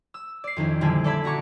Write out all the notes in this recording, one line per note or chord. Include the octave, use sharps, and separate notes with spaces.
E6
D5 C7
F2 D#3 C#4 E4
A#1 D3 G3 E4 A4 G#5
A4 D5 E5 B5 G#6
E4 F#4 A#5 C#6 D6